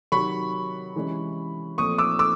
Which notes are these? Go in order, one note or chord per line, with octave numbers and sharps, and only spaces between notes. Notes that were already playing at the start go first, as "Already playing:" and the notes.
C3 D#3 F#3 B5 C#6
C3 E3 G#3 C#4
A#2 F3 A3 C4 C#6 D#6
D6 E6
D6 E6